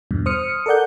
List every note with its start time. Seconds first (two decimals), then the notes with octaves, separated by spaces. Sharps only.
0.11 E2 G2 B2
0.26 C5 D#6 F6 C#7
0.66 A4 A#4 D5 F#5 G6